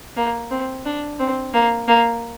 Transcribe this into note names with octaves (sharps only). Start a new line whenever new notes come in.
A#3
C4
D4
C4
A#3
A#3